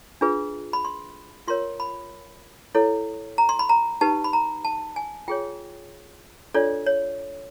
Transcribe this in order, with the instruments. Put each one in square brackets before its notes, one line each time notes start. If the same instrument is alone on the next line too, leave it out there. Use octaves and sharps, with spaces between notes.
[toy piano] D4 F4 G#4 B4
B5
C6
F4 A#4 C#5 C6
B5
E4 A4 C#5
A#5
C6
B5
A#5
D#4 G4 B4 A5
B5
A#5
A5
G#5
F4 G#4 C#5 G5
D4 F4 A4 C#5 D5
C#5